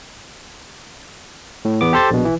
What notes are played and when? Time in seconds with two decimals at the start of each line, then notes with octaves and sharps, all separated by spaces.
1.65 A2
1.81 E2 B3 D6
1.93 G4 A4 C5 C6 A6
2.11 A#1 B2
2.25 E3